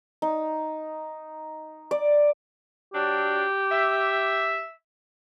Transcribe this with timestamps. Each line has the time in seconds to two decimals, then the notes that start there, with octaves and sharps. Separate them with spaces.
0.22 D#4
1.91 D5
2.94 F#3 D4 G4
3.72 E5